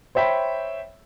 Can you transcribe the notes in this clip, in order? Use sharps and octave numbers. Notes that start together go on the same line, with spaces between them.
C5 C#5 E5 G5 B5